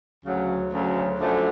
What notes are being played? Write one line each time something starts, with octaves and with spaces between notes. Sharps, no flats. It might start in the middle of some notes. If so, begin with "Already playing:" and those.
D2 C#3 F#3
D2 C#3 F#3
F#2 D3 F3 A3